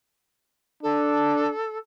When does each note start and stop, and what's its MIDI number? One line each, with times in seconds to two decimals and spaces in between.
0.83 1.52 62
0.83 1.78 69